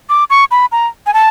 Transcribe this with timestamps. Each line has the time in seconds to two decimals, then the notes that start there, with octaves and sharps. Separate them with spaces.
0.10 D6
0.30 C#6
0.51 B5
0.72 A#5
1.06 G#5
1.14 A5